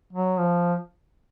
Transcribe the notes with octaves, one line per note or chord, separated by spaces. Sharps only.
F#3
F3